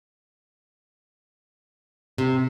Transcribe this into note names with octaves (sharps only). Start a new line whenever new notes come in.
C3